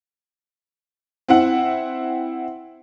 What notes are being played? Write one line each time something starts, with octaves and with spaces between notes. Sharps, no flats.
C4 E4 F#5